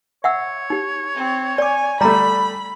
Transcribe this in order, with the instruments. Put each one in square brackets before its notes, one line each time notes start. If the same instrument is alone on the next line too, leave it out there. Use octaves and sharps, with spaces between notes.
[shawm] C#5 [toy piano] E5 F#5 E6
[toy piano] D#4 G4
[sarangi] C4
[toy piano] D5 D6 [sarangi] G#5
[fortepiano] G3 A3 [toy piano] D5 A#5 [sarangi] B5